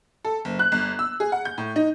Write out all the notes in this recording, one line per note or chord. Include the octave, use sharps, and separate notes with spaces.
A4
F#1
F#6
G1
E6
G#4
F#5
G6
A2
D#4